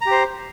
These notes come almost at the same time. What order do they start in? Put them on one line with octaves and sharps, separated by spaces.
A#5 G4 C5